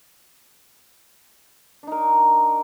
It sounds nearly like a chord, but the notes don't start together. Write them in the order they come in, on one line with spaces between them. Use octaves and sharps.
D4 D#4 A#4